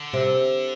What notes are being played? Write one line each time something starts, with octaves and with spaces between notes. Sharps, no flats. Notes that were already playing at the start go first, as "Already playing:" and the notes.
Already playing: D3
C3